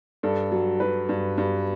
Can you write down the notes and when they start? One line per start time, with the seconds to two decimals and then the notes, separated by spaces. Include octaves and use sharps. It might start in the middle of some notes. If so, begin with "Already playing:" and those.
0.23 G2 A4
0.52 F#3
0.80 F#3 B4
1.09 G2
1.38 G2